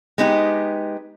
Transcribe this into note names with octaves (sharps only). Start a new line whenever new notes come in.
G#3 B3 D#4 G4